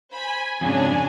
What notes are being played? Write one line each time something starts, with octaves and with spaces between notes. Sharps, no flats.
C5 G#5 B5
F2 G#2 C#3 F#3 C#4 D4